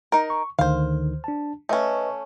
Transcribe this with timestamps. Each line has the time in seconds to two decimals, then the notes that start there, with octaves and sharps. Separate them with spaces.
0.12 D#4 A#4
0.30 C#6
0.59 D2 D3 D#3 C5 F5
1.24 D4 A5
1.69 A3 C#4 B4 D#5